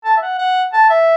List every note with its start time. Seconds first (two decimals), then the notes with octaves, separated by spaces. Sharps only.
0.05 A5
0.17 E5
0.22 F#5
0.39 F#5
0.73 A5
0.90 E5